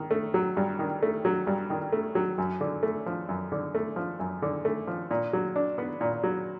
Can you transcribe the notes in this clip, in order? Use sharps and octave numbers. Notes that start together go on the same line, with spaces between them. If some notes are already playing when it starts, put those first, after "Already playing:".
Already playing: D#3
A3
F#3
G2
D#3
A3
F#3
G2
D#3
A3
F#3
F#2
D3
A3
F3
F#2
D3
A3
F3
F#2
D3
A3
F3
A#2
F#3
D4
B3
A#2
F#3